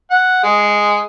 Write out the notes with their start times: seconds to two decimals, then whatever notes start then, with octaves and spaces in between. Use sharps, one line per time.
0.11 F#5
0.44 G#3